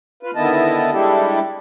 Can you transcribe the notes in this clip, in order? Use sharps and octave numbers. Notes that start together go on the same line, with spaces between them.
F4 B4
D3 D#3 B3 E4 D#5 A5
G3 G#3 D4 E4 G4 A4